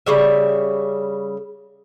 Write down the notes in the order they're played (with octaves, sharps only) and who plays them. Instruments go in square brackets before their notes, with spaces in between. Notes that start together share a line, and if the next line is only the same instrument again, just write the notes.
[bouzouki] C#3 G3 E5